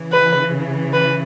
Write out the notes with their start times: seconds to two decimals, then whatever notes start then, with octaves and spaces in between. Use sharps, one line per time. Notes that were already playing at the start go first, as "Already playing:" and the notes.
Already playing: C#3 E3
0.13 B4
0.94 B4